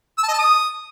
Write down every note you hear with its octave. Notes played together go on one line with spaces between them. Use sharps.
E6
A5
D#5
A5
D#6